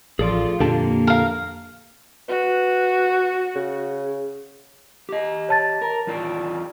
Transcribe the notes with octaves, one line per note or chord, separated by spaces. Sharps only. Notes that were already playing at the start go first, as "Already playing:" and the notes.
A1 F3 F4 G#4 A4 D5
F2 A#2 D3 A#3 G4 A4 A5
A#4 F5
F#4 B4
C#3
G4 D#5
C#5 A5 A6
A#4
E2 F4 D5